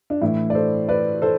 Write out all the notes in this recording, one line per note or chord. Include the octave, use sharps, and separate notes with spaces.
D4
A2 E3 E4
D5
A4 C5
B4 D5
A4 C5